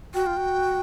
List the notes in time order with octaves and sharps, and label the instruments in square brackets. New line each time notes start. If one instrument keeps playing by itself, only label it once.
[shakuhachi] F#4 [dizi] G5
[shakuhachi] F4
F#4